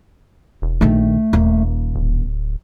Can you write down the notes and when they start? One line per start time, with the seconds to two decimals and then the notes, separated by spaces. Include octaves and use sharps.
0.62 E1
0.81 A#1 D#3 A3
1.33 D#1 A#3
1.94 D1